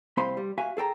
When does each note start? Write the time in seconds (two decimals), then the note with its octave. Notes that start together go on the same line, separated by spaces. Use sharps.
0.17 C2 C4 C5 F5 B5 C6
0.37 G3
0.58 F#4 E5 F5 G#5
0.77 G#4 A4 G5 A#5